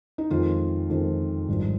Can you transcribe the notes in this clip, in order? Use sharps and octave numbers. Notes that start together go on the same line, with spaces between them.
D#4
F2 D#3 G#3 F4
F2 D#3 G#3
G#1 G2 F3 G#3